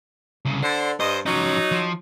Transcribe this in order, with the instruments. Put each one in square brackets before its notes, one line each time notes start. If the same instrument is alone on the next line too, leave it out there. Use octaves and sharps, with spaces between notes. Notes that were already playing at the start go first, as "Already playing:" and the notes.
[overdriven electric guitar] C2 C#3
[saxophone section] D3 [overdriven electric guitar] C5
[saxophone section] G2 D#5 [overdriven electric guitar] C5
[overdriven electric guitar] F3 C#4 [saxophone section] F#3 D#4
[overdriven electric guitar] F3